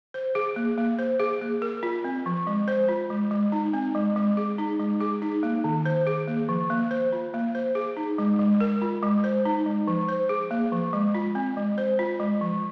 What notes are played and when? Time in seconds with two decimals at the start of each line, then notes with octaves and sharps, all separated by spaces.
0.14 C5
0.35 G#4
0.56 A#3
0.78 A#3
0.99 C5
1.20 G#4
1.41 A#3
1.62 A#4
1.83 F4
2.04 C4
2.26 F3
2.47 G#3
2.68 C5
2.89 F4
3.10 G#3
3.31 G#3
3.52 D#4
3.73 C4
3.95 G#3
4.16 G#3
4.37 G#4
4.58 D#4
4.80 G#3
5.01 G#4
5.22 D#4
5.43 A#3
5.64 D#3
5.86 C5
6.07 G#4
6.28 A#3
6.49 F3
6.70 A#3
6.91 C5
7.12 F4
7.34 A#3
7.55 C5
7.75 G#4
7.97 D#4
8.18 G#3
8.39 G#3
8.61 A#4
8.82 F4
9.03 G#3
9.24 C5
9.45 D#4
9.66 G#3
9.87 F3
10.08 C5
10.29 G#4
10.51 A#3
10.72 F3
10.93 G#3
11.15 F4
11.35 C4
11.57 G#3
11.78 C5
11.99 F4
12.20 G#3
12.41 F3